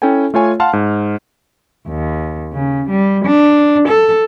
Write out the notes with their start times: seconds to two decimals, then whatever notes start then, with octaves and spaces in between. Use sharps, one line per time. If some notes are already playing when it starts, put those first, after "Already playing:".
0.02 C#4 E4 A4 G5 G#5
0.34 A3 F4 C#5 G#5
0.60 F5 F#5 A5 C6 F6
0.73 G#2
1.88 D#2
2.53 C#3
2.88 G3
3.25 D4
3.88 A4